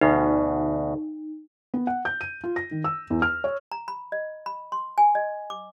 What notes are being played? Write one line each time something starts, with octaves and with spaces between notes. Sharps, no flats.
D2 B2 D#4
B3
F#5
G6
D#7
F4
A#6
D#3
E6
E2
F6
C#5
A#5
B5
D#5
B5
C6
G#5
D#5
D6